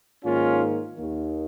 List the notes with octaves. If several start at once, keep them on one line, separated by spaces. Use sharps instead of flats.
G#2 D#3 A#3 C#4 F4
D#2 D#3 A#3